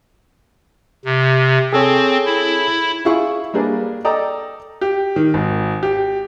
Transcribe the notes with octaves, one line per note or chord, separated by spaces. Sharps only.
C3
C4 G#4 A4 C#5
E4
E4 F4 G#4 C#6
G3 A#3 D4 G#4 B4
A4 D5 D#5 G5 A#5
G4
D#3
G#1
G4